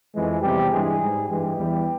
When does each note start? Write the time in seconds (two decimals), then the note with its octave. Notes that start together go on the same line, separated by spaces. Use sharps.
0.14 F2 E3 G#3
0.42 E2 C3 G3 G4
0.71 G2 E3 G#3 G#4
0.99 G#2 G3
1.28 G2 E3 G#3 G4
1.57 E2 E3 G3